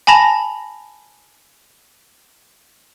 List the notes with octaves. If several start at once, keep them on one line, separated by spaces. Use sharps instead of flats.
G#5 A5 B5 A#6 F7